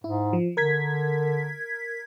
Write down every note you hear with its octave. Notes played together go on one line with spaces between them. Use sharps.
G#2 E4
F3
D3 A#4 G#6 B6